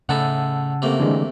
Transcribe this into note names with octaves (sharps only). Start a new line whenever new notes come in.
A2 C#3 D#4 E4 F#5 A5 E6
C3 A3 A#3
D3 E3 G#3